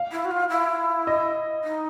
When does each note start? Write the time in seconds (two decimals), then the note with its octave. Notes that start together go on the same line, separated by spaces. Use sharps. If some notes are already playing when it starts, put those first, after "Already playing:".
Already playing: F5
0.12 E4
0.25 F#4
0.31 F4
0.50 E4
1.07 D#5
1.64 D#4